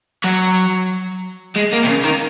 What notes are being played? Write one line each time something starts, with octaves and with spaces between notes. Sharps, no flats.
F#3
G#3
A#3
C3
C#3
D#3